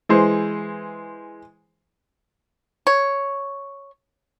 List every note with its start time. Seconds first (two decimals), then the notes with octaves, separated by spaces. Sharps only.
0.09 E3 G#3 C5
2.87 C#5